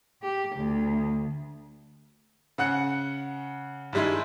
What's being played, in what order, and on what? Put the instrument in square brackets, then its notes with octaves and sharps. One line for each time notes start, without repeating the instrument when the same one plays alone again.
[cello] G4
D2
[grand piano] C#3 F#5 F#6 C#7
G2 D#3 G3 G#3 E4